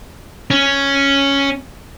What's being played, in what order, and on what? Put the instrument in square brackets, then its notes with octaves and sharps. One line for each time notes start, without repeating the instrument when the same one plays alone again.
[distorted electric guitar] C#4